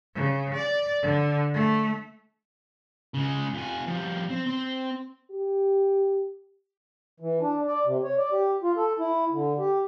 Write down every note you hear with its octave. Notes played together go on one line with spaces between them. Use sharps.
C#3
D5
D3
A3
C#3 G#3
F2 G#5
F3 G3
C4
C4
G4
E3
D4
D5
C3
C#5
D5
G4
F4
A4
E4
D3
G4